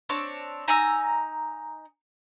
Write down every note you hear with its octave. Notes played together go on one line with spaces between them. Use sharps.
C4 D4 C#5
D#4 G#5 A#5 E6